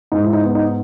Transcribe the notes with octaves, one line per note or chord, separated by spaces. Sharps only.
G#2 D#4
E4
D#4
B3
D#4